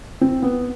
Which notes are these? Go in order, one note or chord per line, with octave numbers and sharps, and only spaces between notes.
C4
B3